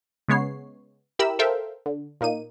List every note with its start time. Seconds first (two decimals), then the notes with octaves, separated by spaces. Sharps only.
0.28 C#3 G#3 B3 C#5 C7
1.19 E4 G4 A#4 B5 E6
1.39 A4 A#4 C5 E5 F5 G5
1.86 D3
2.21 A#2 A#3 D#4 D#7